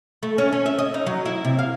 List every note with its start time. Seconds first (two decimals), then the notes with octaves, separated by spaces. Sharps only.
0.23 A3
0.38 C#4
0.52 C#4
0.66 E5
0.78 D#5
0.94 D#4
1.06 F#3
1.26 E4
1.45 C3
1.59 F5